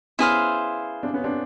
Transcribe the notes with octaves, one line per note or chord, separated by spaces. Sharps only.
B3 C#4 E4 G#4 C5 F5
C4 D4
B3 C#4
C4 D4